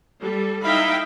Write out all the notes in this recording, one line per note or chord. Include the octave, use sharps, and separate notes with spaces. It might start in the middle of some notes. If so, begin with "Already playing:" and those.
G3 A4
D#4 E4 E5 F5 G5 B5